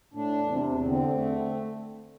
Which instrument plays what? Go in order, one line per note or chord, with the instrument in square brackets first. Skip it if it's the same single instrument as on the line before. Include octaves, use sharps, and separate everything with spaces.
[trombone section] A2 [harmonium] D4
[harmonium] E2
[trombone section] C3
[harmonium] E2
[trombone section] D3 [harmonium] C4
[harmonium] A3